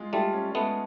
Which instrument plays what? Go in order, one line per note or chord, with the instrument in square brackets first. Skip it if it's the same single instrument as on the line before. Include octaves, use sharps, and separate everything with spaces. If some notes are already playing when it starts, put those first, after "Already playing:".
Already playing: [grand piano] G#3 F4
[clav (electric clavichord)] G3 A3 [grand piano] F4
[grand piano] C#4
[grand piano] G#3 [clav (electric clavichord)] A3 B3